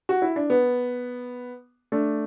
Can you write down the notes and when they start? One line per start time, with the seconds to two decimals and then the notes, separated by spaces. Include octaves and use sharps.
0.09 F#4
0.22 E4
0.36 D4
0.50 B3
1.92 A3 D4